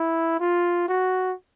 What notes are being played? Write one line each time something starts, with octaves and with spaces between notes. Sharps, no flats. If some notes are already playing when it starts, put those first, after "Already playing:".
Already playing: E4
F4
F#4